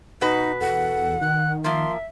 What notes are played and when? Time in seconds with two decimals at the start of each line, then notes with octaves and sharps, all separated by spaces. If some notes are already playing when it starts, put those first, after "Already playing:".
0.21 B2 D#4 F#4 B4
0.61 E2 A4 F#5
1.21 D#3 F#6
1.64 F3 A#3 E5 C6